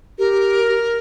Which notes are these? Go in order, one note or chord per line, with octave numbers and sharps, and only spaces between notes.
G4 A#4